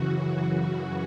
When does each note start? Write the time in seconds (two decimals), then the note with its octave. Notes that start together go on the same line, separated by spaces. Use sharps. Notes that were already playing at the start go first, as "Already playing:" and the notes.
Already playing: F#2 C#3 E3 F#4
0.14 F#4